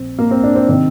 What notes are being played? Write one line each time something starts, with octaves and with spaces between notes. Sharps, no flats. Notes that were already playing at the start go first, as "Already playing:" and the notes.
Already playing: A#1 C4
A#3
C4
D4
C4
C3 D#3 C4